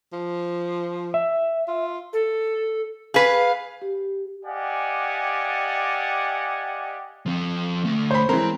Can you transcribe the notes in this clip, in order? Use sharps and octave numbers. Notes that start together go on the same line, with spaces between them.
F3
E5
F4
A4
G#4 B4 F5
G4
G4 D5 D#5 F5 F#5 G#5
F3 C4
D2 A3
C5 C#5 B5
E3 G#3 C4 A#4